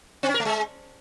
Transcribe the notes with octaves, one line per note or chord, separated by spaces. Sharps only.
C4
C#4
A#4
A3
G#3